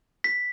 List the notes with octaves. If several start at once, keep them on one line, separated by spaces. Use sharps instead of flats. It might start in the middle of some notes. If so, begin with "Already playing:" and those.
B6